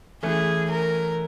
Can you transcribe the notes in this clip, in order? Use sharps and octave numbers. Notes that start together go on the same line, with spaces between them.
E3 A3 C#4 G#4
A#4